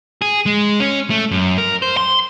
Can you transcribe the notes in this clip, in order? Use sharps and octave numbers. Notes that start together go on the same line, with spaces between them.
G#4
G#3
C#4
A3
F#2
A#4
C5
C6